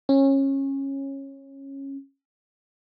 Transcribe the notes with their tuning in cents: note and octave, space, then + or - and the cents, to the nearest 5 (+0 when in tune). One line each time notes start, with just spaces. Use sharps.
C#4 -20